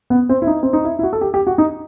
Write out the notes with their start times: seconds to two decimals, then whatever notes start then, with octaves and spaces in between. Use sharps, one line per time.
0.10 B3
0.29 C4
0.42 E4
0.47 D#4
0.63 C4
0.73 D#4
0.84 E4
0.99 E4
1.03 F#4
1.13 A4
1.21 G4
1.34 G4
1.47 F#4
1.58 D#4